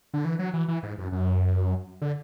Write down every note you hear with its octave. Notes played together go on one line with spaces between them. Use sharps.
D3
E3
F#3
E3
E3
G#2
F#2
F#2
D3